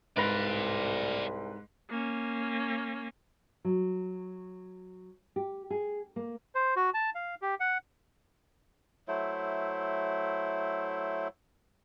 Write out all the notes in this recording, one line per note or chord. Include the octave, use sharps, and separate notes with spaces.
C2 G#2 B4 D5 F5 A#6
A#3 C#4
F#3
G4
G#4
A#3
C5
F#4
A5
F5
G4
F#5
F#3 A3 E4 C5